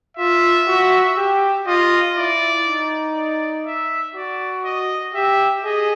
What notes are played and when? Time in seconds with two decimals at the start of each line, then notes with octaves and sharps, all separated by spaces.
0.17 F4 E5
0.67 F#4
1.17 G4
1.67 F4 D#5
2.17 E4 D5
2.66 D#4
3.16 D5
3.66 E5
4.15 F#4 D5
4.65 D#5
5.15 G4 E5
5.64 G#4 D#5